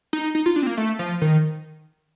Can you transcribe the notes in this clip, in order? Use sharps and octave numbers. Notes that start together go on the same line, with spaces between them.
D#4
D#4
F4
D4
C4
A#3
A3
F3
D#3